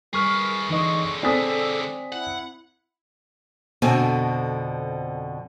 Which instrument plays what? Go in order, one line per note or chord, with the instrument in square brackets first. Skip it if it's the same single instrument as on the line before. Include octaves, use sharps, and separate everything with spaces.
[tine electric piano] G3 C#6 F6 [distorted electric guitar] G#4 B4 [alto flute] A#4
[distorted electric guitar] D3 G#3 [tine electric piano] E3 D#4 D#5 [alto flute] C#6
[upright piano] C4 B6 [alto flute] A4 [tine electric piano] D5 G#5 D#6
[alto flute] E4 [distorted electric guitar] F#5
[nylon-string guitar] F2 B2 D3 C4 G#5